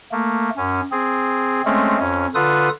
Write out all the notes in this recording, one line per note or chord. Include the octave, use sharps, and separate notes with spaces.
A3 A#3
F#2 C#4
C4 G#4
G#3 A3 C4 C#4
F2 C#4
D3 F4 A4 B4 D#6 F#6